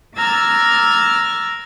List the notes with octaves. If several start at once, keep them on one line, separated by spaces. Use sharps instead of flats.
A#5 D6 E6 F6 G#6 A6